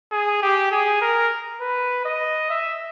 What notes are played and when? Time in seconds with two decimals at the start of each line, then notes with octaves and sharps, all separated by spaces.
0.12 G#4
0.42 G4
0.71 G#4
1.01 A#4
1.61 B4
2.05 D#5
2.50 E5